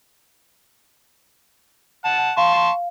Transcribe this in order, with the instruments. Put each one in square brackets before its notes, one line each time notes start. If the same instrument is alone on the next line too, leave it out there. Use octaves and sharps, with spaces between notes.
[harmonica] F#5 A5
[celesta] F5 [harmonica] A5 C6 C#6